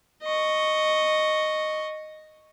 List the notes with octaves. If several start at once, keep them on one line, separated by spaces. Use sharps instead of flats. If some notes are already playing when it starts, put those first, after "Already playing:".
D#5 C#6